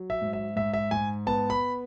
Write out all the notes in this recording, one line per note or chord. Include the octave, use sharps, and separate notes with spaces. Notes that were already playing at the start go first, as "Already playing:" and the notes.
Already playing: F#3
E5
G#2
E5
G#2 E5
E5
G#2 G#5
B3 A5
B5